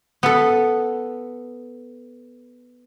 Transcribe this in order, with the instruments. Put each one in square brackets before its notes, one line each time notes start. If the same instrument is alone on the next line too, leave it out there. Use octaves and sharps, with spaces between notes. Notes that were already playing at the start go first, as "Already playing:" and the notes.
[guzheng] B3 A4